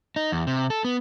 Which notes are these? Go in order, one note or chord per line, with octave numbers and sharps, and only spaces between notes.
D#4
E2
C3
A4
B3